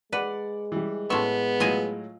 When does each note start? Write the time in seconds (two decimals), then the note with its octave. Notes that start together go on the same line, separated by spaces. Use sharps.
0.13 G#3 B4 D5 F#5
0.72 E3 G3
1.10 A2 B3 E5 A5 C6 C#6
1.60 A2 F#3 F4 D#5 G#5